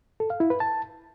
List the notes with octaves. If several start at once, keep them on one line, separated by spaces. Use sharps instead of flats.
A4
F5
E4
B4
A5